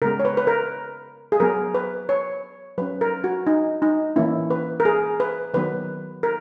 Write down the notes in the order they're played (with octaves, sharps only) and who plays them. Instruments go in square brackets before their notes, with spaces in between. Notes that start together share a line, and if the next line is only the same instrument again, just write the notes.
[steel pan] C#3 G#3 B3 A#4
C#5
B4
B4
A#4
G#4
F#3 B3 A#4
B4
C#5
F#3 C#4 B4
A#4
F#4
D#4
D#4
E3 A#3 C#4 E4
B4
A#4
G#4
B4
D#3 F#3 B3 B4
A#4